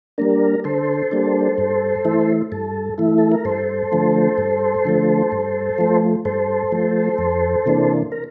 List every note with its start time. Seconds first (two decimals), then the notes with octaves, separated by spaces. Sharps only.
0.18 G3 A#3 D4 A#4
0.64 D3 A4 C5
1.12 G3 A#3 D4
1.58 G2
2.05 E3 A3 E4
2.52 G2 A4
2.98 E3 A3 E4
3.18 A4
3.32 A#4
3.45 G2 A4 C5
3.92 D3 F3 A3
4.38 G2
4.85 D3 F3 A3
5.32 G2
5.78 F3 A3
6.25 G2 A4 C5
6.72 F3 A3
7.18 F2
7.66 C3 E3 A#3 D4
8.12 A#4